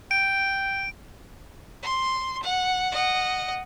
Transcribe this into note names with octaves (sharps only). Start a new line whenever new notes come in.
G5 D7
C6
F#5
D#5 F#5